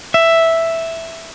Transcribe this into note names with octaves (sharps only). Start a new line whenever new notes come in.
E5